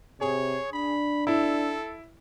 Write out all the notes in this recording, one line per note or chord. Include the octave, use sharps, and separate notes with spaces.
C3 G#4 C#5
D4 B5
E4 A4